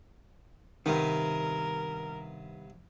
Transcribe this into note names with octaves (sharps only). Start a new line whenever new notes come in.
G2 C3 D#3 B3 A#4